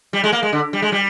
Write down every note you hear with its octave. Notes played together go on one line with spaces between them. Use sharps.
G3
G#3
A#3
G#3
D3
G3
G#3
G3